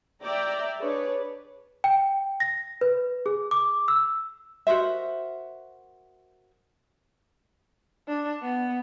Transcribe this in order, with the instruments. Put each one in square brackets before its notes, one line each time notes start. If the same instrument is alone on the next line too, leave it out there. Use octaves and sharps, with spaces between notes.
[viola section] D5 E5 G5 A#5
D4 G#4 B4 C#5 D5
[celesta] G5
A#6
B4
G#4
D6
E6
[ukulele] F#4 A#4 C5 E5
[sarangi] D4
B3